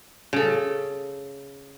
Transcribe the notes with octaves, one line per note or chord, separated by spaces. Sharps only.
C#3 A4